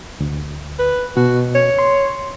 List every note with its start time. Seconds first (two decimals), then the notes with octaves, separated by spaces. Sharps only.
0.20 D2
0.79 B4
1.17 B2 F#4
1.55 C#5
1.79 C6